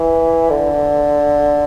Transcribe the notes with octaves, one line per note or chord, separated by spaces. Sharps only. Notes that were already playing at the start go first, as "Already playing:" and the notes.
Already playing: E3
D3